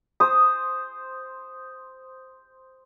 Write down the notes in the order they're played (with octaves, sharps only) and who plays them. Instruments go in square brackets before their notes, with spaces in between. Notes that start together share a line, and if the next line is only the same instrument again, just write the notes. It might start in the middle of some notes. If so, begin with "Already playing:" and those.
[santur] C5 D#6